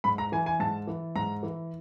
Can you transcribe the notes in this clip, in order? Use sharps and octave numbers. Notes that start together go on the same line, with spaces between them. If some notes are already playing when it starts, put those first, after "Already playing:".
G#2 B5
A#5
E3 G#5
G#5
G#2 A5
E3
G#2 A#5
E3